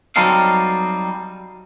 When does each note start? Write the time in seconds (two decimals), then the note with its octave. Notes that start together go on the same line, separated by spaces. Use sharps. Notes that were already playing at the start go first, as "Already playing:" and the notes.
0.16 F#3 G3 C4 D#4 A4 F5